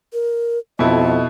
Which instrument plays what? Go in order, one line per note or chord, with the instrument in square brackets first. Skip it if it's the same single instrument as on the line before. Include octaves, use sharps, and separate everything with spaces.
[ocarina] A#4
[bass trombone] F2 [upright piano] B2 E4 A4 [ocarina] D#5